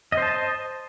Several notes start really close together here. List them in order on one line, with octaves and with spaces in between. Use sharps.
D#5 C5 A5